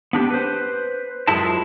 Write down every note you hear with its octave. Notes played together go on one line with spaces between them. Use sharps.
B3 D4 G4
B4 C5
F#2 F3 G#3 E4 A5